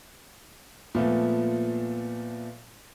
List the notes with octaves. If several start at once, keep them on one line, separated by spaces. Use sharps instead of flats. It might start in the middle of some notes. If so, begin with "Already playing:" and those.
A#2 F3 A3 B3